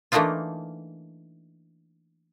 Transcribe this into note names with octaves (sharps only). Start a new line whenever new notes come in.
E3 A3 A#3 D4 D#4 F4